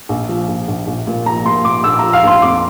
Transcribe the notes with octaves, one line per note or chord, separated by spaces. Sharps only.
A#1
F3
A#1
A#1
A#1
A#2
F3 A#5
A#2 C6
A#2 D6
A#1 E6
F3 A#5
F5
A#1 C6
F2 D6